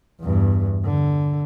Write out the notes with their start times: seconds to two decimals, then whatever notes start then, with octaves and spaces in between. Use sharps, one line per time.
0.20 E2 G2
0.84 D3